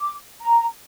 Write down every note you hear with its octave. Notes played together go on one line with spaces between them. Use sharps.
D6
A#5